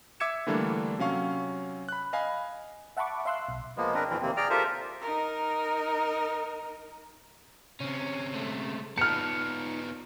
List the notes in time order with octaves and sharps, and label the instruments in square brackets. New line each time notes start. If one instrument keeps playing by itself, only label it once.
[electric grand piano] E5 D6 E6 G#6 C#7 E7
D3 E3 G3 A3 A#3 D4
C3 F#3 C#4 F5 C#6
B5 F#6
D#5 F5 G#5 B5
[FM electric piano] E5 F#5 A5 B5 C#6 D6
E5 F5 C6 E6 F#6
B1
[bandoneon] F3 G#3 A#3 B3
C4 D4 A#4 B4
F2 B2 E3 C4
D#2 C3 A#3 C4
G#4 D5 G5 A#5 F6
F4 G4 A4 A#4 C5 E5
[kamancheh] D#4 A#4
[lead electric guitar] C#3 C4 [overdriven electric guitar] C#4
[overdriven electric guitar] G#3 A3
[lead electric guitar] B3 F4 [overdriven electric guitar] D#4 A5 [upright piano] F6 C#7